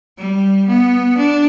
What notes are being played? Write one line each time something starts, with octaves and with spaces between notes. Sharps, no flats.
G3
B3
D4